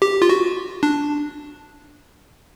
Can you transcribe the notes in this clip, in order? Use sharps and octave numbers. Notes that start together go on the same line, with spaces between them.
G4
F4
F#4
D4